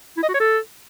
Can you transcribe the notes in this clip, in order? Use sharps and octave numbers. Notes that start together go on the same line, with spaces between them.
E4
D#5
F#4
C#5
A4